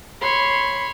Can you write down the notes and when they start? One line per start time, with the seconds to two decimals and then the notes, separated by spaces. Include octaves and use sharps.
0.21 C#5 B5 C6